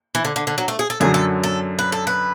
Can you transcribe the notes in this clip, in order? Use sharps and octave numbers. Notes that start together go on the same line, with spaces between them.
E3
D3
D3
D3
F#3
A3
G#4
A4
F#2 D3 F#3 G#4
A4
A4
B4
A4
B4